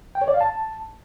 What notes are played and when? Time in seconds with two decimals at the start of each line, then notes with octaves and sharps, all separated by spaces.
0.15 G5
0.22 C#5
0.28 D5
0.34 F5
0.41 A5